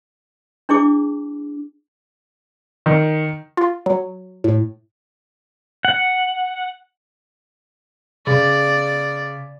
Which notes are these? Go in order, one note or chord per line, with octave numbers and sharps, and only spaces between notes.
D4 E4 G#4 D6
D#3
F4
F#3
A2
F#5
C#3 D5